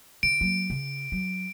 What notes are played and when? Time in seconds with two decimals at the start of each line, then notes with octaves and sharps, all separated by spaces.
0.23 D3 D7
0.41 F#3 A#3
0.70 C#3
1.12 F#3